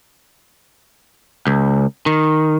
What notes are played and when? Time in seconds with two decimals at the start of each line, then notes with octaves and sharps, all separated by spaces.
1.47 C#2
2.06 D#3